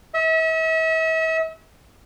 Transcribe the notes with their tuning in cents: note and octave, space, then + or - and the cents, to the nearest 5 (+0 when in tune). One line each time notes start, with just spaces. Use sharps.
E5 -40